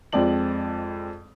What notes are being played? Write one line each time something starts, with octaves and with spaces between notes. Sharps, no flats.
F2 G#3 C4 D5 A5 F#7